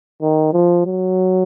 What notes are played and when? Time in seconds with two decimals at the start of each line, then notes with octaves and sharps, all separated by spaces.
0.22 D#3
0.53 F3
0.86 F#3